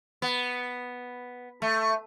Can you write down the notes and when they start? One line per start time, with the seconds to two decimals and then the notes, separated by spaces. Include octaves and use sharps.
0.22 B3
1.62 A3